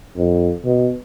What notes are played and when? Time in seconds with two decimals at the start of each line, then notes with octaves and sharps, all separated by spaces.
0.16 F2
0.64 B2